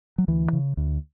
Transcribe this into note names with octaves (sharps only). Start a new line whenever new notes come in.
F#3
D2 E3
C#3
D2